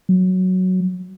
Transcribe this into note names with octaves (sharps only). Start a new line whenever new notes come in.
F#3